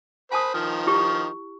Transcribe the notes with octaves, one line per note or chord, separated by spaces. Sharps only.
C5 G#5 A5 B5 D#6
D#3 F3
E4 G4 C#6